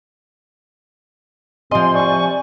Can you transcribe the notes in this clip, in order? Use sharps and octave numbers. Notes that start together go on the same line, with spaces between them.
C3 F3 D#5 G#5 C6
D5 G#5 C#6